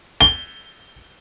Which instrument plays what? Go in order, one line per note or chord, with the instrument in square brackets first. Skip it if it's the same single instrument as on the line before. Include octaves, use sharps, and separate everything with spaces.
[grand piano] G7